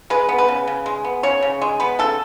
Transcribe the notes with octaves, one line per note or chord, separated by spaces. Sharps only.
G#3 B4
B3
B4
C#3
C#3
G#3
B3
C#3 C#5
C#3
G#3
B3 B4
C#3 A4